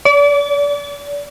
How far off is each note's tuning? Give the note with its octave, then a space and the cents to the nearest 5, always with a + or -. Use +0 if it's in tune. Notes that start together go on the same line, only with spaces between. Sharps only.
D5 -35